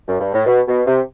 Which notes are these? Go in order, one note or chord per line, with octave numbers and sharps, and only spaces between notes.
F#2
G2
A2
B2
B2
C3